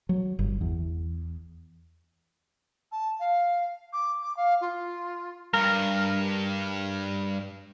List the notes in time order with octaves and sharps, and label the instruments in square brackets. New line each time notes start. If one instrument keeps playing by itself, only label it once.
[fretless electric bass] F#3
G1
E2
[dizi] A5
F5
D6
D6
F5
F4
[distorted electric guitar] G2 [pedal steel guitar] A#4